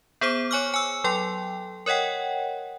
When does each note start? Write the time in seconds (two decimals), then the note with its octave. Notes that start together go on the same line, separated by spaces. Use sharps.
0.21 B3 G#4 C5 D6
0.51 C#5 G#5 C#6 D6 F6
0.74 G#5 E6
1.04 F#3 A4 G5 C6
1.86 A#4 C#5 D#5 F#5 G5